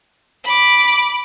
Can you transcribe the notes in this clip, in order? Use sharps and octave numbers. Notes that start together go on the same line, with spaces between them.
B5 D6